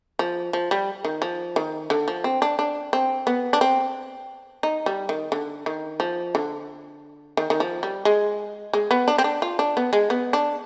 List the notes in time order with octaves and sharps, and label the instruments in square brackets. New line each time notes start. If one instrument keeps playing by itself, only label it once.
[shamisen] F3
F3
G3
D#3
F3
D#3
D3
F3
C4
D4
D4
C4
B3
D4
C4
D#4
G3
D#3
D3
D#3
F3
D3
D#3
D#3
F3
G3
G#3
G#3
B3
D4
C4
D4
F4
D4
B3
G#3
B3
D4